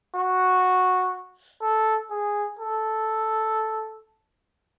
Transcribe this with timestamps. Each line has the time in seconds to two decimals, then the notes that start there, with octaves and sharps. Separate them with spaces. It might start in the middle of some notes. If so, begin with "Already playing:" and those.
0.15 F#4
1.61 A4
2.10 G#4
2.59 A4